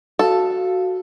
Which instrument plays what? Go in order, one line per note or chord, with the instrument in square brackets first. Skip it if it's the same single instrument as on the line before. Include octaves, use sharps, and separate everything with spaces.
[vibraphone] F#4 F5 [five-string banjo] A4